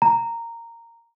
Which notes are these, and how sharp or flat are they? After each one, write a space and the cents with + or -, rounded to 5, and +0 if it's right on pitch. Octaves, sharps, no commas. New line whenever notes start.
A#5 -10